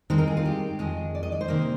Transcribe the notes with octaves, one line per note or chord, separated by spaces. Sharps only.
G2 D#3 G#3 C4 C5
A#4
G#4
F4
G4
F2 D#3 G#3 G#4
D5
D#5
D5
C5
C3 D#3 A#3